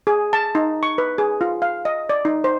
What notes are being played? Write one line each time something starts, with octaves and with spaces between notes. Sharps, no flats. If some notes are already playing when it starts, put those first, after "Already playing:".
G#4
A5
D#4
C#6
B4
G#4
F4
F5
D#5
D5
D#4
C5